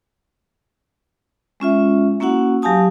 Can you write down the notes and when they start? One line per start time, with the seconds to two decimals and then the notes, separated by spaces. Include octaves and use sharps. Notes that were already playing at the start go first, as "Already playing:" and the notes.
1.60 G#3 C#4 F4 E5
2.20 A#3 C#4 E4 F#4 F#5
2.62 F#3 G4 F5 G#5 A5 D#6